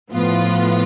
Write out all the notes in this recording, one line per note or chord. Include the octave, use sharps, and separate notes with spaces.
A2 F3 B3 F4